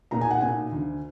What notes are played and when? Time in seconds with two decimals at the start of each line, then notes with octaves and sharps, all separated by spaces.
0.11 B1 A#2 A#5
0.21 G#5
0.30 F#5
0.41 B1 A#2 G#5
0.72 D2 D3